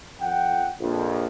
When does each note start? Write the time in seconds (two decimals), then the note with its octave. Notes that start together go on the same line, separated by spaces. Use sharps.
0.21 F2 F#5 G5
0.80 A#1 F2